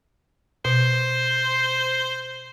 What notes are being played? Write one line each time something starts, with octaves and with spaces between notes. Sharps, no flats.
B2 C5